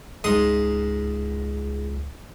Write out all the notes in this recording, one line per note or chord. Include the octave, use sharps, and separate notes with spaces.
C#2 G#2 C6 D#6